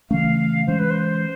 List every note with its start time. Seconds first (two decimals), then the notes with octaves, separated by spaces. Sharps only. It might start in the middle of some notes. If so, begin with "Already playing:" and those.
0.10 C#3 E3 A3 C#4 F5
0.67 E3 G#3 C#4 C5
0.79 B4
0.90 C5